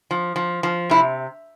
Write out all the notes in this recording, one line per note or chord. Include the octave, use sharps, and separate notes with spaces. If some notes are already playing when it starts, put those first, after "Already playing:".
F3
F3
F3
C3 E4